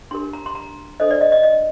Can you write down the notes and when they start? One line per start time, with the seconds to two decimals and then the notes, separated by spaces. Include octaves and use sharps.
0.11 D4 G4 A#4 C6
0.33 A#5
0.46 C6
0.55 A#5
1.00 D4 A4 C5 D#5
1.11 D5
1.21 D#5
1.32 D#5
1.43 D#5